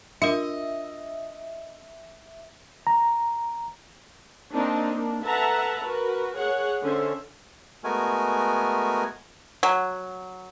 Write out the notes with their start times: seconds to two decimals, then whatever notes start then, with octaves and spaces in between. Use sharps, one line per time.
0.22 D4 F4 A#4 D#5 E5
2.87 A#5
4.53 A#3 C4 D4 D#4
4.93 A#3 D4
5.23 A4 B4 E5 F#5 A5 A#5
5.81 F#4 A#4 B4
6.38 G#4 C#5 F#5
6.82 D3 C#4 C5 E5
7.84 G#3 A3 B3 F#4 A#4 G#5
9.63 F#3